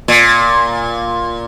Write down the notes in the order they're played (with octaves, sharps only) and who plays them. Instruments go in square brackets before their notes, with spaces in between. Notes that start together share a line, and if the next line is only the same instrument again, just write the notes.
[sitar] A#2